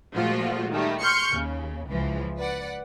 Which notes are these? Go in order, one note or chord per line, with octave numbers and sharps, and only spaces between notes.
A#2 F3 G#3 A3 F4 F#4
D#3 G3 A3
C6 C#6 F6 G6 C#7
D#2 C#3
C#2 E3 F3
B4 D5 F#5